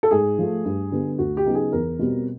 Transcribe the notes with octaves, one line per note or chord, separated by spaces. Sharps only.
A4
G#2 G#4
F3 A3
G2
D3 G3 B3
D2 F#4
G4
C#3 F#3 B3 D#4
G#4
E2 A#4
B2 G3 C4